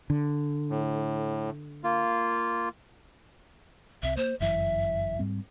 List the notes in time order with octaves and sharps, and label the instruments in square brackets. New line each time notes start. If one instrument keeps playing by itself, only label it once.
[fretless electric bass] D3
[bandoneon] A2
A#3 F4
[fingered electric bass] C2 C3 [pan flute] E5
[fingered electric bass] A#3 [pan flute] C5
[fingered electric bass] G1 F#2 E3 [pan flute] E5
[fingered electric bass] G#2 G3 C4